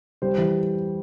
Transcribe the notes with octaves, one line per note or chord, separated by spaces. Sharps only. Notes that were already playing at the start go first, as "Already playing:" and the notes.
G3 C5
E3